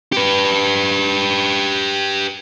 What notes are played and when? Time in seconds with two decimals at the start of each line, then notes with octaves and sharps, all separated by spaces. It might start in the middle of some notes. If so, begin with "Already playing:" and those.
0.12 G4 B4